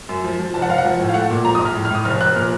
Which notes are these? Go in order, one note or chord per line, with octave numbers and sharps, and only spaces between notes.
F#2
F3
F3
F1 A5
F#5
F1 F5
F#5
F3
A2
F5
A3 F#5
A#2
F3 A#5
D#6
A#1
F6
A2
F6
A2 D#6
F1 F6
F1 F#6
A#2 F6